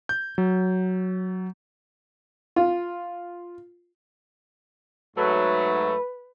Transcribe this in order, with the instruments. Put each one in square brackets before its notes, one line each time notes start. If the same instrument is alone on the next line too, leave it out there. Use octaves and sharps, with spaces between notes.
[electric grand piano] G6
F#3
[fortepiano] F4
[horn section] G#2 F#3 A3 [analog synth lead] B4